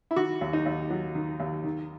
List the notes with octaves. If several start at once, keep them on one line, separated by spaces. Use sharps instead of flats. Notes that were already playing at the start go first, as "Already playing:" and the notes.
E4
D#3 F#4
D#2
D#4
D#2
F#3
D#3
D#2
D#3